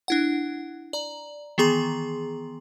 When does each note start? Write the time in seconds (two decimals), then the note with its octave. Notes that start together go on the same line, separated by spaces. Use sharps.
0.08 D4 E4 F#5
0.93 D5 A#5
1.58 D#3 E3 B3 G#4 A#5 C6